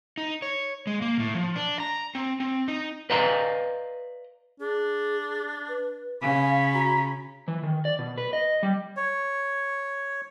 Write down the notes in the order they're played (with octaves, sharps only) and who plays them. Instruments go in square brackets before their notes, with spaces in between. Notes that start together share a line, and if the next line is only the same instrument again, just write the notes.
[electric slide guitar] D#4
C#5
G#3
A#3
A2
F3
D4
A#5
C4
C4
D#4
[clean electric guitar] B4 D5 D#5 F5 A#5 C6
[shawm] D4 [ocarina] G#4
[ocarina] B4
[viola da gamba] C#3 [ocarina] F5 [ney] G#5 [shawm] B5
[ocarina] F#4 [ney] A#5
[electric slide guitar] E3
D#3
D5
B2
B4
D#5
G3
[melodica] C#5